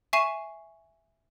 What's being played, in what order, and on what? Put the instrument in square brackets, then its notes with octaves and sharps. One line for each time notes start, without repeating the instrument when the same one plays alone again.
[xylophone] E5 G#5 C#6 C7 D#7 E7